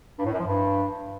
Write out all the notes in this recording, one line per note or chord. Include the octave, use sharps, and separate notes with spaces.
G2
A2
F#2
F3
G2